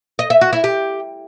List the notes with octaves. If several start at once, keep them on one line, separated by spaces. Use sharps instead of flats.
D#5
E5
F#4
E4
G4